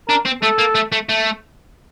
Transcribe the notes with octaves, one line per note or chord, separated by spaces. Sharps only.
D4 A#4
C4
A3 A4
A#3
A3
A3
A3